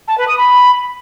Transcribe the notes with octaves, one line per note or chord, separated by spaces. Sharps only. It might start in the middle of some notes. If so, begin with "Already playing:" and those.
A5
B4
D#6
B5